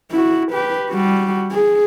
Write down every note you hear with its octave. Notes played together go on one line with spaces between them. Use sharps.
E4 F#4
G4 B4
G3 F#4
G#4